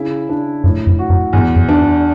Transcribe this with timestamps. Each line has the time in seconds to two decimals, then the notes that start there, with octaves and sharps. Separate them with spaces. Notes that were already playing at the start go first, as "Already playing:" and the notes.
Already playing: C#3 E4
0.29 D4
0.64 F#2 A2
0.87 F#2
0.99 F#4
1.10 F#2
1.33 E2 G2
1.56 F#2
1.69 D4